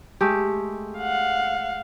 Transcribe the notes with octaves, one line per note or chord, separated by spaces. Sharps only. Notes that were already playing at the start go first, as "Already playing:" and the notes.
G#3 A3 G4
F5 F#5